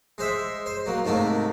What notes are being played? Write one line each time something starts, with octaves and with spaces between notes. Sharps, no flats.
G#3 C5 E5
C5
F#3 A#3
G#2 C3 A3 A#3